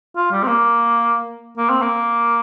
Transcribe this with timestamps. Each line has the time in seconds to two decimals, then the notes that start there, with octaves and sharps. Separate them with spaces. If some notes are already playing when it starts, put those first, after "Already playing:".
0.16 F4
0.31 G3
0.43 C4
0.48 A#3
1.57 A#3
1.70 C4
1.82 A#3